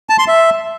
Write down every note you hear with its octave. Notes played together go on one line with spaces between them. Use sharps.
A5
C6
E5